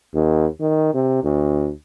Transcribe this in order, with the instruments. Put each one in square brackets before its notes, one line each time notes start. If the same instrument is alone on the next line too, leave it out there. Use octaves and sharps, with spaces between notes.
[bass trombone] D#2
D#3
C3
D2